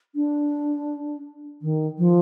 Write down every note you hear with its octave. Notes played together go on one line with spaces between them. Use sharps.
D4
D#3
F3